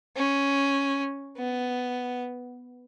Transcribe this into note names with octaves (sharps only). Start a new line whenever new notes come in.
C#4
B3